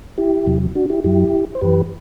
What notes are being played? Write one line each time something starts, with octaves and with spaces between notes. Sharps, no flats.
E4 G4
E2 C3 F#3
D4 F#4
E4 G4
F#2 F#3 E4 G4
C5
F#2 E3 G4 B4